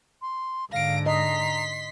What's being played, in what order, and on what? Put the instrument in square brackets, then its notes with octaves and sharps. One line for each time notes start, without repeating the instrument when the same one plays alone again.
[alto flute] C6
[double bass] G#2 D3 [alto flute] F5 [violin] A#6 D7
[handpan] D#5 [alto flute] A#5 [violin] C6 B6